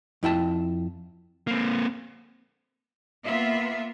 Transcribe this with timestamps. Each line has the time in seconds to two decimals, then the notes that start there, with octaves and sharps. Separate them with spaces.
0.23 F2 E4 G5 A5
1.47 A#3 C4
3.24 A#3 B3 F4 E5